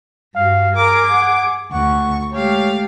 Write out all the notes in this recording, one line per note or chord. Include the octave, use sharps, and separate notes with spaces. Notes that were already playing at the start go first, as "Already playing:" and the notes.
G2 F#4 F5
G#4 A#4 D6
F#5
D2 F#5 C#6
G#3 A3 G4 C#5 F5